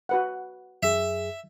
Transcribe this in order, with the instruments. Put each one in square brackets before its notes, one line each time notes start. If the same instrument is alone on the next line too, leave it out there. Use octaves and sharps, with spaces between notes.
[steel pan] F#4 B4 F#5
[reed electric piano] F#2 G#4 [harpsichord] E5